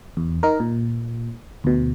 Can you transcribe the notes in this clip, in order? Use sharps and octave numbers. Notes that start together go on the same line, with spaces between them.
E2
D#4 A#4
A#2
D2 B2